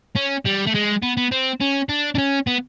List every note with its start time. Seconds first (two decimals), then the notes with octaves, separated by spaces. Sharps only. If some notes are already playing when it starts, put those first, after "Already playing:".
0.16 C#4
0.46 G3
0.67 A3
0.75 G#3
1.03 B3
1.17 B3
1.32 C4
1.61 C#4
1.89 D4
2.15 D4
2.18 C#4
2.47 B3